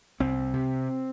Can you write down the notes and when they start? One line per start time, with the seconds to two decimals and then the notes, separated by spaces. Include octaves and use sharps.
0.20 C2 C4
0.53 C3